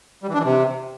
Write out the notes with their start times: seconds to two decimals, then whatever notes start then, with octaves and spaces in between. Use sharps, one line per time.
0.23 G3
0.28 E3
0.34 D4
0.39 E3
0.44 C3